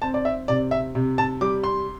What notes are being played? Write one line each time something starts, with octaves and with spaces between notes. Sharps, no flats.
C4 A5
D5
E5
C3 D5
E5
C3
A5
G3 D6
C6